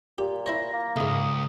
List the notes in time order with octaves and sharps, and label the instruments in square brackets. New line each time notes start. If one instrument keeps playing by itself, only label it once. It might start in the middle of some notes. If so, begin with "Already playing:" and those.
[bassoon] A#2 [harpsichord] G4
[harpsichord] E4 C5 C#5 [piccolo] A#6
[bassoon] A#3
[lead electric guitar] C#2 [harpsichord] G#2 A3 [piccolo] D#6